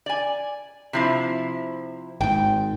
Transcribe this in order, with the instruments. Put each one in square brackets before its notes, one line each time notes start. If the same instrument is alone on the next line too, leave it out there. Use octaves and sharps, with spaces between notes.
[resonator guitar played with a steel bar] D5 G#5
C3 F3 E4
[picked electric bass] G#1 G#2 [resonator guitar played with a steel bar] G5